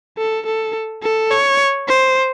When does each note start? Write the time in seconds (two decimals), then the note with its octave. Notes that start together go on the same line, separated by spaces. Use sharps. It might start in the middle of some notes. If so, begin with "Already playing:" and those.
0.18 A4
0.46 A4
1.03 A4
1.31 C#5
1.88 C5